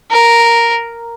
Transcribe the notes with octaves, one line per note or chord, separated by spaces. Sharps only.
A#4